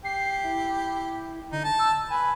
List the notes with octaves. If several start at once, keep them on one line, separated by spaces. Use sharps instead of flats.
G4 C7
E4
D3 D#4
A5
E6
B4 G#5